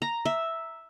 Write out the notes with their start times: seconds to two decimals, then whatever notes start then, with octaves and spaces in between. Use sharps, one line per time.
0.02 A#5
0.25 E5